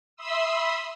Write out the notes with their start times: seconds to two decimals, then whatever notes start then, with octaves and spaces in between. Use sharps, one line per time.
0.16 E5 B5 C6 D#6 E6